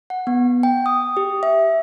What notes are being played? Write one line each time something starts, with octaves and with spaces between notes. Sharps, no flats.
F#5
B3
G5
D#6
G4
E5